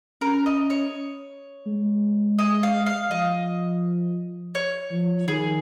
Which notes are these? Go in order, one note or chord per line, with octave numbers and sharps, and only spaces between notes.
C#4 A#4
D#5
C#5
G#3
D#5
F5
F5
F3 D#5
C#5
F3
D#3 G#4